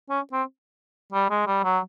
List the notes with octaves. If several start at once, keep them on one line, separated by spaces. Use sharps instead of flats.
C#4
C4
G3
G#3
G3
F#3